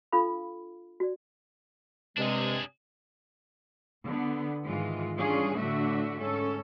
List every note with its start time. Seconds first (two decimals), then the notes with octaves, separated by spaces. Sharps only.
0.12 D4 F4 A4 F5 B5
1.00 F#4 D5
2.18 G2 C3 G#3 D4 G#4
4.06 D3 B3
4.66 G#2 D#3 E3 G#3 F4
5.18 E3 G3 C#4 D4 F4 G#4
5.59 A2 D3 A3 D4 F#4 E5
6.22 G#2 C#4 A4